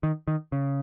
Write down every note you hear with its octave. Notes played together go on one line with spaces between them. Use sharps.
D#3
D#3
C#3